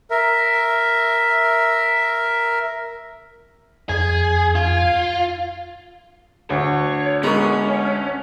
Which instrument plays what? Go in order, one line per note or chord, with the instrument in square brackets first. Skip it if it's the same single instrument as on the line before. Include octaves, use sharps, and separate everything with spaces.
[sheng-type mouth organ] A#4 E5
[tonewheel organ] F2 G#6 [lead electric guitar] G#4
[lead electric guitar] F4
[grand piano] D2 [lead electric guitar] C#5
[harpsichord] G#3 [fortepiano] B3 A#4 C#6 [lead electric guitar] C#4